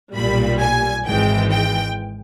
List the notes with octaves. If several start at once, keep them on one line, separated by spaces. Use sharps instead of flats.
B1 A#2 G3 B5
G#5
G#1 G#2 E3 G#3 G5
G5